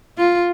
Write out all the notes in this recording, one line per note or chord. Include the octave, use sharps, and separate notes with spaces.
F4